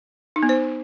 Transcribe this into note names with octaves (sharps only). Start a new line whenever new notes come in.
D#4
B3
C5